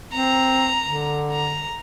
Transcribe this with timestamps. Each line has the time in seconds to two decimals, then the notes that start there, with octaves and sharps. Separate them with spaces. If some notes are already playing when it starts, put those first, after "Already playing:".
0.13 C4 A#5
0.85 D3
1.31 A#5